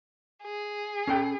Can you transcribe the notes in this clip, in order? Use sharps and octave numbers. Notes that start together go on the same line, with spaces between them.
G#4
C#4 A4 G5